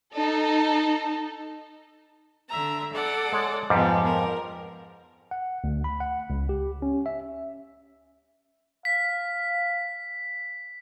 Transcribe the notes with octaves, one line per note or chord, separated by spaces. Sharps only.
D#4 A4
D3 E5 A#5
A4 D5 F#5
G#3 C#5
F2 G#2 F3 G3 G#3 B3
A#4
F#5
D2
B5
F#5
C#2
G4
C#4
E5
F5 B6